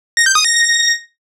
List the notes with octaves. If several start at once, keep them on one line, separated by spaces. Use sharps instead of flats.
A#6
G6
D#6
A#6